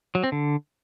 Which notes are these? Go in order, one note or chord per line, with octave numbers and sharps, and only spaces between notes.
F#3
C4
D3